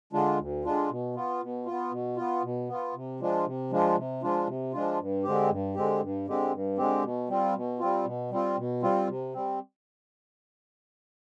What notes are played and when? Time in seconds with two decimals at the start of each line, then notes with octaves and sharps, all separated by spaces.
0.13 D3 G#3 D4 F4
0.39 D2
0.65 D3 G#3 D4 F4
0.90 B2
1.15 B3 F4
1.41 B2
1.66 F4
1.71 B3
1.92 B2
2.17 B3 F4
2.43 B2
2.69 B3 F4
2.94 C3
3.20 F3 G#3 D4 F4
3.46 C3
3.71 F3 G#3 D4 F4
3.97 C3
4.22 F3 G#3 D4 F4
4.47 C3
4.73 F3 G#3 D4 F4
4.99 G2
5.24 D3 G#3 C4 G4
5.49 G2
5.75 D3 G#3 C4 G4
6.01 G2
6.27 D3 G#3 C4 G4
6.53 G2
6.77 D3 G#3 C4 G4
7.03 B2
7.29 G3 C4 F4
7.55 B2
7.79 G3 C4 F4
8.05 B2
8.31 G3 C4 F4
8.57 B2
8.82 G3 C4 F4
9.08 C3
9.34 G3 C4